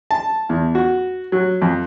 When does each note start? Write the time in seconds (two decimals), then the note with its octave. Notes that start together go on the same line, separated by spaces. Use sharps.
0.11 A5
0.49 E2
0.75 F#4
1.32 F#3
1.62 F2